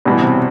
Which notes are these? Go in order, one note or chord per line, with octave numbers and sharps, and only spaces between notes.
A1 G2 B2 E3
C3